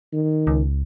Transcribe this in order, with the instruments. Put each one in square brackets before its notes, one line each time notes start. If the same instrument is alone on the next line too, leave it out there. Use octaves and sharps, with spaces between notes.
[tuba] D#3
[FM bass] C#2